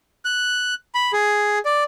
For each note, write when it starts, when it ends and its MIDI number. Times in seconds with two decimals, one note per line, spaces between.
0.25 0.74 90
0.95 1.12 83
1.13 1.59 68
1.65 1.84 74